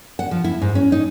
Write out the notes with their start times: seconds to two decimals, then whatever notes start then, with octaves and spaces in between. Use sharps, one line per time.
0.19 F#5
0.31 F3
0.44 E4
0.62 G#2
0.75 C#4
0.92 D#4